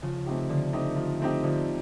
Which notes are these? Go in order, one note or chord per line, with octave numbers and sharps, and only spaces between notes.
C#3 F3
A3 C4 D#4 G4
D3 F3
A3 C4 D#4 G4
F3
A3 C4 D#4 G4
D3 F3